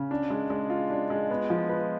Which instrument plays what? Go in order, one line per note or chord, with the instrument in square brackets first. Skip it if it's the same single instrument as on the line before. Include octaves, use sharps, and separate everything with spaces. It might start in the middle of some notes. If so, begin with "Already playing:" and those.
Already playing: [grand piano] C#3
D4
G#3
G#3
F4
D4
G#3
B3
F3
B4